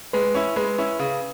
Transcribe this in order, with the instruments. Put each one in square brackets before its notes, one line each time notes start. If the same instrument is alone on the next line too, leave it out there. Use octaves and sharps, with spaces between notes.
[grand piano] G#3 [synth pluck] B4
[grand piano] C#4 E4
[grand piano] G#3 [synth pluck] B4
[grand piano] C#4 E4
C#3